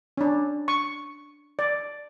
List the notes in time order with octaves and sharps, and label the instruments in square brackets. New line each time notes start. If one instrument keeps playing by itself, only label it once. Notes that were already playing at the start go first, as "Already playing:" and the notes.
[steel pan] C#4 D4
C#6
D5